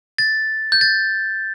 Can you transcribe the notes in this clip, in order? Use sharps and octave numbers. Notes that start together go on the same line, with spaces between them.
A6
G6
A6